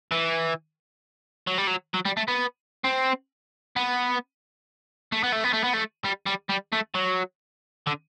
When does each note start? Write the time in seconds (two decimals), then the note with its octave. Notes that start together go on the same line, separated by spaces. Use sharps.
0.12 E3
1.47 F#3
1.58 G3
1.67 F#3
1.94 F#3
2.05 G3
2.17 A3
2.28 B3
2.84 C4
3.76 B3
5.12 A3
5.23 B3
5.32 A3
5.44 B3
5.53 A3
5.64 B3
5.73 A3
6.04 G3
6.26 G3
6.49 G3
6.73 A3
6.95 F#3
7.87 D3